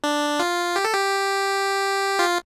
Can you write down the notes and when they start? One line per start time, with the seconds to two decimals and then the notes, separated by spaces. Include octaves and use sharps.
0.04 D4
0.40 F4
0.76 G4
0.84 A4
0.94 G4
2.19 F4